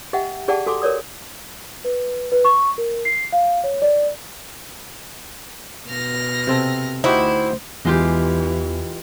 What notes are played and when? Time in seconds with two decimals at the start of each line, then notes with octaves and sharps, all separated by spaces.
0.13 G4 D#5 E5 F#5 G5
0.48 G4 G#4 D5 F#5 G5 A5
0.66 F#4 A4 G#5 C6 D6
0.82 A#4 C#5 D5 D#6
1.84 B4
2.32 B4
2.45 C#6
2.78 A#4
3.05 C7
3.32 F5
3.64 C#5
3.82 D5
5.88 B2 F6 A#6
6.47 C3 C4 A4
7.04 D2 D#4 E4 F#4 G4 C5
7.85 E2 E3 G#3 F4 G4